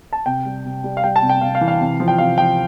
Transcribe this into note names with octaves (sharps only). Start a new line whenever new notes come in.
A5
C3 G5
G3
C3
G3
F5
G3 G5
A5
C3
G5
C3 F5
F5
E3
F5
C3
F3
G5
C3 F5
F3 G5